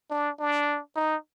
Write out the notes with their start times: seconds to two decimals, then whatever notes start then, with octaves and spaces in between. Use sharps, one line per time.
0.11 D4
0.40 D4
0.96 D#4